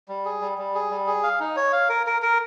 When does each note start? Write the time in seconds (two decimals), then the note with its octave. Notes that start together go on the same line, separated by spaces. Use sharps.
0.08 G3
0.25 G#4
0.41 G3
0.58 G3
0.75 G#4
0.91 G3
1.07 G#4
1.23 F5
1.40 D#4
1.56 C#5
1.72 F5
1.89 A#4
2.07 A#4
2.22 A#4